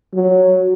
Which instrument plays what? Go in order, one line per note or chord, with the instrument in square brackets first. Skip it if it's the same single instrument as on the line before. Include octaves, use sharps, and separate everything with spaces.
[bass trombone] F#3